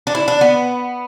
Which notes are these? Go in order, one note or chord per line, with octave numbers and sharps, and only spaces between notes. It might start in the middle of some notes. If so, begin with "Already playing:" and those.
D4
E4
D4
B3